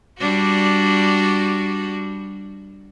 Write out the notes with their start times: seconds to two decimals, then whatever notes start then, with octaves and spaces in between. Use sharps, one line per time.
0.18 G3 D4 F#4